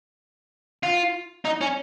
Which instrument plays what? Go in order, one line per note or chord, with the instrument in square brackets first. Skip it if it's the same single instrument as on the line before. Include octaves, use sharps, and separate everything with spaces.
[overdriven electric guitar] F4
D#4
C#4